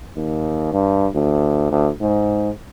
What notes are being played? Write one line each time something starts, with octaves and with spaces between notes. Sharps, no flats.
D#2
G2
D2
D2
G#2